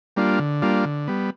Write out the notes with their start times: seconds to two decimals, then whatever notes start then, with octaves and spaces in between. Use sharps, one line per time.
0.16 G3 A#3 D4 F4
0.39 D3
0.62 G3 A#3 D4 F4
0.85 D3
1.08 G3 B3